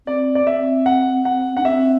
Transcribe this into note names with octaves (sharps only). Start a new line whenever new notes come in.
C4 D5
D5
C4 E5
F#5
F#5
D4 F#5
C4 E5